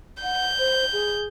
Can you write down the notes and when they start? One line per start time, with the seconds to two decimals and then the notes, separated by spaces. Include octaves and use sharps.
0.23 F#5 G6
0.59 C5
0.93 G#4